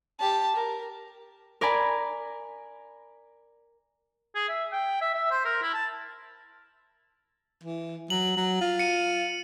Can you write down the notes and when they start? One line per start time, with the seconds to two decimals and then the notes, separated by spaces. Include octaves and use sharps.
0.19 G4 A5
0.56 A#4
1.61 A#4 D5 G#5 B5
4.35 G#4
4.49 E5
4.72 G5
5.01 E5
5.14 E5
5.31 C5
5.45 A#4
5.62 E4
5.74 A5
7.63 E3
8.10 F#3 F#7
8.37 F#3
8.61 F4
8.79 C#7 D#7